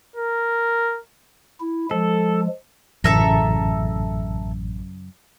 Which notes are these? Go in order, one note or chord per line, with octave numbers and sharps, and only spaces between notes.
A#4
E4
F3 G#3 A4
A1 F#2 C#3 A4 E5 A#5